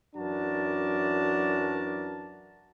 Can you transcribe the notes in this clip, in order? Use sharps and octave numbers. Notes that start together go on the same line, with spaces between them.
F#2 E3 D4 F#4 A#4 A5